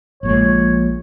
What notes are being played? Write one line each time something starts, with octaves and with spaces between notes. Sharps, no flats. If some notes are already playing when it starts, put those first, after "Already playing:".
A#1 A#2 G#3 C#5